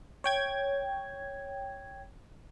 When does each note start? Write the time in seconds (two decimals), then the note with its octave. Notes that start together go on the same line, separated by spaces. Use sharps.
0.24 C#5 G5 G#6